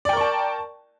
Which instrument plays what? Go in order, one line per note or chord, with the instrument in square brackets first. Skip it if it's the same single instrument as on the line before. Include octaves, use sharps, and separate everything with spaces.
[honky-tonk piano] D5
G5
A#4
C#6
A5